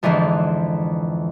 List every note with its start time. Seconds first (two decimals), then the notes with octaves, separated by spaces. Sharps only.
0.03 F2 G#2 D3 E3 F3